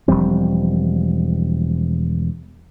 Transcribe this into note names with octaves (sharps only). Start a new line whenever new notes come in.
E1 F3 G3 C4